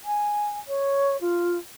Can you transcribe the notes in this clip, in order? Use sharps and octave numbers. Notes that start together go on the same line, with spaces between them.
G#5
C#5
F4